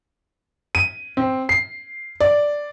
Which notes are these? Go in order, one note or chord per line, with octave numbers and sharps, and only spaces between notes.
D#7
C4
C7
D5